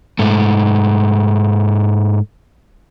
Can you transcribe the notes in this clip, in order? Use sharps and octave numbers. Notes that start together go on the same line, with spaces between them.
G#2 A3